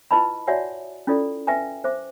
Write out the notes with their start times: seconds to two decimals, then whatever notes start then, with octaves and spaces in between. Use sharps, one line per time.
0.11 E4 F4 B4 D#5 A5 B5
0.47 F#4 C#5 D5 E5 F#5 G#5
1.07 C#4 E4 F4 A4 D5
1.47 B4 E5 G5 G#5 A#5
1.84 C5 E5 D6